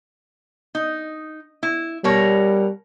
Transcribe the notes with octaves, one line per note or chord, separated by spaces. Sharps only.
D#4
E4
B2 G3 A#4 C#5